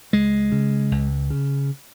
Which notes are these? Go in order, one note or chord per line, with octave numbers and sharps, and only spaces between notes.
C#2 G#3
C#3
C#2
C#3